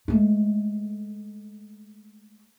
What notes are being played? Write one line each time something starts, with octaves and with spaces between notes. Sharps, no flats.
G#3 A3